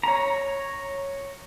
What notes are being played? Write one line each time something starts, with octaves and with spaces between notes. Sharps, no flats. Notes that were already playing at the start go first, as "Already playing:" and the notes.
C#5 A#5